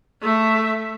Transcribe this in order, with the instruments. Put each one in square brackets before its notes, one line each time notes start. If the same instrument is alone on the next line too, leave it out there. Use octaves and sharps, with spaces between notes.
[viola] A3 E5